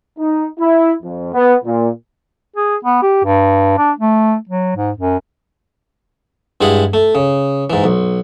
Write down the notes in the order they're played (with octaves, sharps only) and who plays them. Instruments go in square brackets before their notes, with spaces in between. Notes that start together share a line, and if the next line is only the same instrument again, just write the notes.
[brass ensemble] D#4
E4
F2
B3
A#2
[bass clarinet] G#4
B3
G4
G2
D4
A3
F#3
G#2
F#2
[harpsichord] G2 G#3 E4 G#4 F#5
A3
C#3
G#2 E3
B1